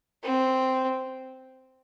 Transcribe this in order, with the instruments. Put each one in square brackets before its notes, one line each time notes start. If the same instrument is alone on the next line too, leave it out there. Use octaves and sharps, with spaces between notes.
[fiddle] C4